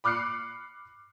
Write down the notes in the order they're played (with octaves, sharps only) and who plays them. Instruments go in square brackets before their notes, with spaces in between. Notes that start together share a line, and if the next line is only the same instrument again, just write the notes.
[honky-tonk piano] B5 D6 F6 F#6 C7 C#7